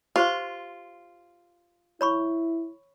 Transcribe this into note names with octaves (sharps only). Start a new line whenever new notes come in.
F4 G4 C5 C6
E4 C#5 B5 C#6